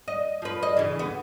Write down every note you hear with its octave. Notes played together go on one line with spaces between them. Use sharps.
D#5
F3 B4
D#5
C#3 E3
D2 B3